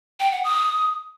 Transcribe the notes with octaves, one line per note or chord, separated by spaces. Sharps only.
G5
F#5
D#6